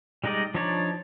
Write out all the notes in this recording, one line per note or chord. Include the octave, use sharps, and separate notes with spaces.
G3 G#3 D#4 D5 D#5
F3 D4 D#4 C#5 D5